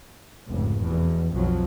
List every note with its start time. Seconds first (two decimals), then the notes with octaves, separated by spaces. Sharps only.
0.48 F1 C#2 G#2
0.81 E2 B2
1.33 B1 F2 F3 F#3